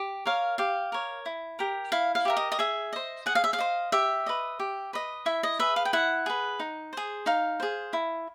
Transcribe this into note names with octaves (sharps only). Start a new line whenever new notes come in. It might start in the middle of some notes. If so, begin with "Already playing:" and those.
Already playing: G4
A#4 C#5 F5
G4 F5
A#4 C#5
E4
G4 A#4
E4 F5
F5
G4 A#4 E5
D#5
D#5
G#4 E5
C5 D#5
G#4 F#5
F5
E5
F5
C5 D#5
G4 E5
B4 D#5
G4
B4 D#5
E4 E5
D#5
G#4 B4 E5
F5
G5
E4 F#5
G#4 B4
D#4
G#4 C5
D#4 F5
G#4 C5
E4